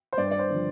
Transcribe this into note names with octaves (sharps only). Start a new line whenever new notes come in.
C5
G2 D5
D5
C5
D3 F3